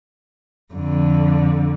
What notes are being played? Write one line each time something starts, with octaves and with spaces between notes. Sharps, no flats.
F2 D3